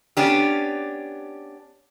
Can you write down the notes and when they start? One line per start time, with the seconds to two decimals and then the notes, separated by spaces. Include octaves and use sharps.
0.17 B3 C#4 D4 G4